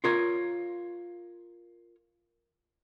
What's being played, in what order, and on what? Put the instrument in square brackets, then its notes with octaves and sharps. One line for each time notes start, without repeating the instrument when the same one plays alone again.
[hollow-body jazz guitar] F4 A#4 C#5